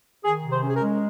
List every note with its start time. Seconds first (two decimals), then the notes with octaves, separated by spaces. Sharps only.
0.25 D#3 G#4
0.44 C3
0.50 C5
0.63 C#4
0.69 G#4
0.75 A#4
0.81 G#3